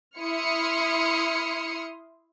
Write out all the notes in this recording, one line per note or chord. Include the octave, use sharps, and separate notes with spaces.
E4 C6 D#6 F6 C#7